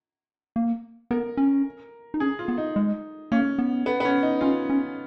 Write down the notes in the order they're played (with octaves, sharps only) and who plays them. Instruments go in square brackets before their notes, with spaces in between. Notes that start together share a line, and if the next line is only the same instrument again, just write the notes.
[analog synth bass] A#3
[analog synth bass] B3 [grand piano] A#4
[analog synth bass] C#4
D#4
[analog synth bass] C#4 [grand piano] G#4
[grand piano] F4
[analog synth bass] B3
[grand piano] D#4
[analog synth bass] G#3
[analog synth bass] A#3 [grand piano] C#4
[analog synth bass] B3
[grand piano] B3
B3
C#4
D#4
[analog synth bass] C#4 [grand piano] F4
[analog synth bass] C#4